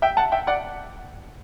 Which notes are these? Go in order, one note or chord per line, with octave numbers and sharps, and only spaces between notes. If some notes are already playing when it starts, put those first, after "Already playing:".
E5 G5
F#5 A5
E5 G5
D5 F#5